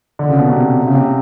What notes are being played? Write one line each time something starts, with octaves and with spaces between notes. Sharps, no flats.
D3
C#3
B2
C3
C3
C#3
C3